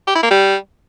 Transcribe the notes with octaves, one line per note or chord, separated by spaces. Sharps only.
G4
E4
A#3
G3